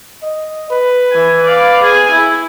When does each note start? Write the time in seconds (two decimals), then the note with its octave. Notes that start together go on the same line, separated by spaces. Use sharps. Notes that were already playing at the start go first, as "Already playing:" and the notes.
0.22 D#5
0.70 B4
1.11 E3 G#5
1.44 D5 F5
1.82 G#4 G#5
2.11 E4